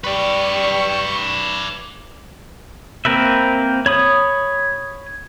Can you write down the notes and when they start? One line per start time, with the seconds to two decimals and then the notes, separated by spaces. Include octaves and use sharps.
0.04 G3 B4 D5 C#6
3.05 A#3 C4 A#4 B4 E5
3.86 C#5 B5 D#6